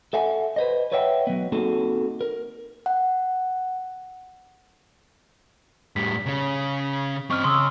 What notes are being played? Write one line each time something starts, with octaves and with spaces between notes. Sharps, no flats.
A4 E5 F#5 G#5
B4 C5 D#5
B4 C#5 D#5 E5 F#5 G5
F#3 B3
A#3 C4 D#4 F#4 G#4 A4
A#4
F#5
A2 G3 B6
C#3 C#4
C4 D#5 C#6 F6
C#3 C6 D#6 E6